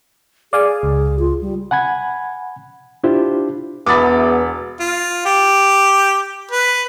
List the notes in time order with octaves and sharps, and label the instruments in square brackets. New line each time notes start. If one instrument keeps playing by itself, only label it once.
[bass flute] G#4 [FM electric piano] D5 F5 G#5
[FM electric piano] C#2
[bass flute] F4
G3
[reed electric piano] F#5 G#5 B5 G#6
D4 E4 F4 G4 C5
[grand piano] E1 B5 [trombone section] E2 [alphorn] B3 [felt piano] D6 D#6 A6
[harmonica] F4
G4
B4